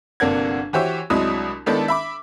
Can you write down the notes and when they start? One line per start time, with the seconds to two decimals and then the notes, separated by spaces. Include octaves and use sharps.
0.20 G1 C3 A#3 D4 F#5 G#6
0.73 E3 F#4 G4 C5 C#5 E5
1.10 C2 F#3 G#3 D4 E4 D#6
1.66 D#3 G#3 B3 D4 E4 A4
1.88 E5 B5 D6